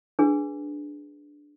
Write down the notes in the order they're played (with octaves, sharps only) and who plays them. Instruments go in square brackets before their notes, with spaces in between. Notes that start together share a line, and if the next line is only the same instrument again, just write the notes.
[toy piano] D4 G#4 B4